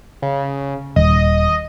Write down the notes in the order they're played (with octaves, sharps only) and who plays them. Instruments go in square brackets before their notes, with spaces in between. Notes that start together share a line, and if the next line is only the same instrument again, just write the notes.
[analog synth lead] C#3
[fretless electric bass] D#1 [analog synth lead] D#5